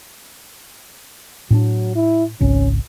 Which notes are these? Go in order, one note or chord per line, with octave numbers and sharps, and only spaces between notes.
A2 F#3 C4 D4
E4
G#1 C#2 C#4